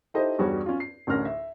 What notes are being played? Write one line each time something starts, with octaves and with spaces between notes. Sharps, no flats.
D#4 E4 G4 A4 C5 D#5
E2 G2 G3 F#4 G4 C#5
C#4 F4
C7
A1 D2 C#4 A#4 F6 A#6
E5